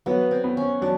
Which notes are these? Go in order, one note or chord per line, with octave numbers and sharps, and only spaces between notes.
F#3 B3
C4
B3
C#4
F#3 D4